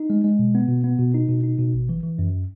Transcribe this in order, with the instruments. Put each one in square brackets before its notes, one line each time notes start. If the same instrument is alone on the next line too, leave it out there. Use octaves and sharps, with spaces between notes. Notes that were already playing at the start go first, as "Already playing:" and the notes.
Already playing: [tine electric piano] D#4
G#3
G#3
B2
B3
B2
B3
B2
D#4
B2
D#4
B2
G#1
E3
E3
F#2